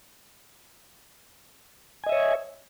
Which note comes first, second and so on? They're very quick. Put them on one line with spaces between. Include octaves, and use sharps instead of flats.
G#5 D#5 E5 C#5